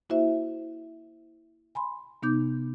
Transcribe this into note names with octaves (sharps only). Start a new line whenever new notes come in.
A#3 E4 F#4 C5 E5
G#5 B5 C6
C3 B3 D#4 D6 G6